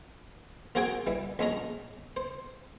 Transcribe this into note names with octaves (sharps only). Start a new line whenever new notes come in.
A#3 C4 F#4 G#4 G5 G#5
E3 G3
A#1 G#3 C#4 A#5
C5